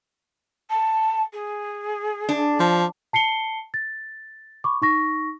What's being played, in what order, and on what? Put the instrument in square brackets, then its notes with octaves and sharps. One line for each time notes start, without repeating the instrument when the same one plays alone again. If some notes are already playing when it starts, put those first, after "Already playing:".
[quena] A5
G#4
[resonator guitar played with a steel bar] D4
[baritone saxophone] F3
[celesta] A5 C7 C#7 G7
A6
B5 C#6 D6
D#4 C#6 A#6